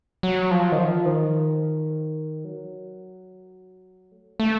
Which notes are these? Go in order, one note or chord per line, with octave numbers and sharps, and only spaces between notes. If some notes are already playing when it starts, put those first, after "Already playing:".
F#3
F3
D#3
F3
D#3
F#3
A3
A3